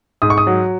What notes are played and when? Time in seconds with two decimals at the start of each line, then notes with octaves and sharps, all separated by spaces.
0.22 G#2 D#6
0.30 C#6
0.38 D#6
0.47 F#3